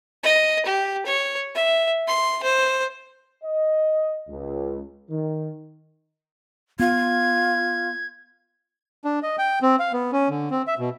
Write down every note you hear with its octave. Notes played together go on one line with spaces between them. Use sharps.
D#5
G4
C#5
E5
C6
C5
D#5
C#2
D#3
B3 F4 G#6
D4
D#5
G5
C4
F5
B3
C#4
D3
C4
E5
B2